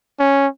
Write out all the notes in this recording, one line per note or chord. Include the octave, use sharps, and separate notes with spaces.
C#4